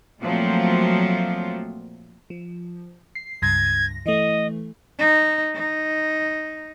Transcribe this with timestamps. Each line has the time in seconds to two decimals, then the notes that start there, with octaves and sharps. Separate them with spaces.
0.21 A#2 F3 F#3 A3 C4 F4
2.30 F3
3.15 C7
3.42 C#2 G2 G#6 A#6
4.06 E3 A3 D#5
4.99 D#4
5.55 D#4